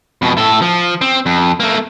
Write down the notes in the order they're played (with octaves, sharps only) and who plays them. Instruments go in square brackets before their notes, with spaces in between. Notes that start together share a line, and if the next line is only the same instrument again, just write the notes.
[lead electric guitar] F2 B2
A2 A4
F3
C4
F2
A3 A#3